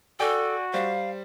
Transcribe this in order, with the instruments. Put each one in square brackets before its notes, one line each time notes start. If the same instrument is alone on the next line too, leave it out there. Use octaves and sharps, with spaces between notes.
[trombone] F#4 [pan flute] A4 [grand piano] D5 G5 G#5
[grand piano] G3 C5 [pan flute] F5